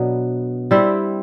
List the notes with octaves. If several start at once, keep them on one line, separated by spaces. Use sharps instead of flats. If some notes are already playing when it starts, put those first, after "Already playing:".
Already playing: B2 F#3 B3 D4
G3 C4 E4